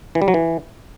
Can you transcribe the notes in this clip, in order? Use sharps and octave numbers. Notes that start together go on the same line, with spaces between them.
E3
G3
F#3
E3